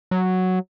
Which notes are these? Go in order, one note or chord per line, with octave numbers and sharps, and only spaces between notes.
F#3